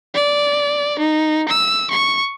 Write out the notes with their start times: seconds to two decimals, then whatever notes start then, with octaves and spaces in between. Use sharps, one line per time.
0.14 D5
0.99 D#4
1.48 E6
1.90 C#6